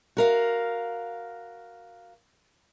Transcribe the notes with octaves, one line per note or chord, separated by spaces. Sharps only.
F#4 A#4 F5